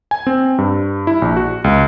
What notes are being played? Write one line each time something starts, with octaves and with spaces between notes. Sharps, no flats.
G#5
C4
G2
E4
A#1
F#4
C#2